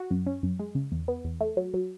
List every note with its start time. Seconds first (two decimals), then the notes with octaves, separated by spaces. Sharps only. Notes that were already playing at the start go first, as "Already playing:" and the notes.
Already playing: F#4
0.11 F#2
0.26 C#4
0.43 F#2
0.59 G#3
0.75 C#3
0.92 E2
1.08 B3
1.24 E2
1.41 A3
1.57 F#3
1.74 F#3